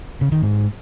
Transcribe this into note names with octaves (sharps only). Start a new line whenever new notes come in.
C#3
D#3
G#2